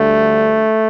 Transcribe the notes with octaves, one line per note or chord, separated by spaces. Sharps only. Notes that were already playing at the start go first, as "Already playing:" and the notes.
Already playing: D2 D3 G3 A3